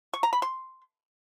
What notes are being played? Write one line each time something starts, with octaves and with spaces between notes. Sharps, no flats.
C#6
A#5
B5
C6